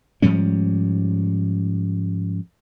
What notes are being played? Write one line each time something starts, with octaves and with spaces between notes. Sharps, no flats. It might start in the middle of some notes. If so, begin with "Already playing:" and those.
G#2 F3 G3 C#4